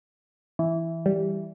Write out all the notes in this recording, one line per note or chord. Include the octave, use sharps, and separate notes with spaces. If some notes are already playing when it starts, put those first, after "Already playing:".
E3
G3